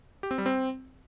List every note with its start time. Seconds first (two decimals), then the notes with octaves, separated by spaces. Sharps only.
0.23 G4
0.31 C4
0.38 G3
0.46 C4